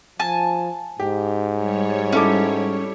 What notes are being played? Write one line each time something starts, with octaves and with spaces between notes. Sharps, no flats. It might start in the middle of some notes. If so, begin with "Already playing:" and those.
F3 G#5 A5
G#2 G4
G3 C#5
C#4 E4 A4 D6